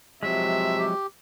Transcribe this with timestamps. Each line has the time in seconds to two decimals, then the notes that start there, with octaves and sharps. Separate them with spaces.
0.23 C3 F3 F#3 G#3 E5
0.78 G4